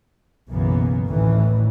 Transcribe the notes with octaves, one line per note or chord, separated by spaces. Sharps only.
B1 F#2 C#3 E3 A#3 B3
A1 D2 A2 D#3 E3